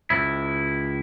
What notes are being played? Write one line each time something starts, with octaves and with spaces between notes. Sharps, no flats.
C#2 E4